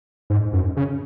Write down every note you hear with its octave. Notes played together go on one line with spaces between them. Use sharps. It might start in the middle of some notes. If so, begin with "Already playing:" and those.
G#2
F#2
C#3